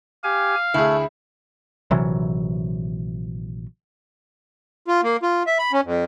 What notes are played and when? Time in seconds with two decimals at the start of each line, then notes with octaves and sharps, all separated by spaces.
0.24 G4 F5 G#5
0.74 D2 A3 E4 G#4
1.91 A#1 C3 E3 F#3
4.88 F4
5.03 A#3
5.23 F4
5.47 E5
5.59 B5
5.73 C#4
5.84 F2